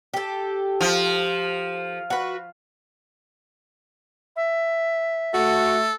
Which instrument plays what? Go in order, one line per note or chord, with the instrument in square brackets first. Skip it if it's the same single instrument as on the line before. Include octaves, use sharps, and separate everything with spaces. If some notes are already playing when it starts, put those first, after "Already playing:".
[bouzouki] G4 A4
[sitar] F3
[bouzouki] F#4 B4
[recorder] E5
[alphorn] A3 [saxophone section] F#4 [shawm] A4